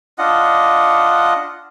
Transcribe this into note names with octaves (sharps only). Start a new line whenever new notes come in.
D4 F4 D#5 F#5